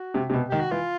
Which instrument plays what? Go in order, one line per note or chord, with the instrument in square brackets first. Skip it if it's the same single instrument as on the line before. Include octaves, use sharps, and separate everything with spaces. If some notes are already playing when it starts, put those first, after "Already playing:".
Already playing: [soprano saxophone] F#4
[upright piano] C3
C3
B2
[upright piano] D#3 [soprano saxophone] G4
[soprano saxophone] F#4
[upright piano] E3 [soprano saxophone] F4